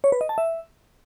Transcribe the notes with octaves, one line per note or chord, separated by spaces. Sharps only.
C#5
B4
D#5
A5
E5